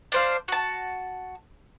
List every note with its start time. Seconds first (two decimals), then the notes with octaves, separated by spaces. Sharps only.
0.12 D4 C5 F5
0.48 F#4 A5